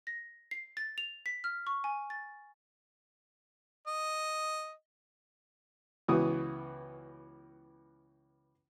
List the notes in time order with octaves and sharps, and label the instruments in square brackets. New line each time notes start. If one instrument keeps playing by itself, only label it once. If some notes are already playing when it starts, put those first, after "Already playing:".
[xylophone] A#6
C7
A6
F7
B6
F6
C#6
G#5
A6
[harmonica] D#5
[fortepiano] C#2 E3 B3 E4 F#4 D#6